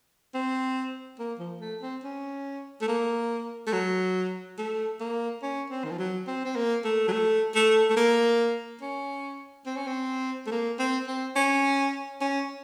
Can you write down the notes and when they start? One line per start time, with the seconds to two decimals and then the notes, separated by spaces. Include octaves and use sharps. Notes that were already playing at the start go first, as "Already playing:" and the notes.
0.34 C4
1.19 A#3
1.39 F3
1.61 A3
1.82 C4
2.04 C#4
2.82 A3
2.88 A#3
3.67 A3
3.73 F#3
4.58 A3
5.00 A#3
5.43 C#4
5.70 C4
5.85 D#3
5.92 F3
5.99 F#3
6.27 C4
6.45 C4
6.56 A#3
6.84 A3
7.08 F#3
7.12 A3
7.55 A3
7.90 A3
7.97 A#3
8.82 C#4
9.66 C4
9.77 C#4
9.87 C4
10.47 A3
10.52 A#3
10.79 C4
11.08 C4
11.36 C#4
12.21 C#4